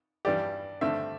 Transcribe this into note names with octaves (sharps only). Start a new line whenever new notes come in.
G2 E3 G3 D4 G4 D5
G2 D3 A3 C4 E5